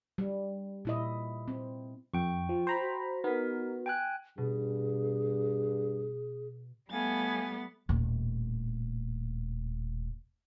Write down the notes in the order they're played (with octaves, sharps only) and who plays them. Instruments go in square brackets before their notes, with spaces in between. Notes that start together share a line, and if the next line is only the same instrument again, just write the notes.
[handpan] G3
A#2 E4 D#5
C4
[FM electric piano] F2 [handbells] G5 C#6
[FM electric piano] F3 [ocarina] F4
[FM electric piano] C5 A#5 B5
[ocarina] F#4
[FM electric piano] B3 [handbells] D#4 A#4
[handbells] G5 G#5 F#6
[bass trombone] G2 [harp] B2 [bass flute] G#4
[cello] G3 B3 [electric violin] A3 A6 [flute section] F5 G#5
[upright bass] D#1 A2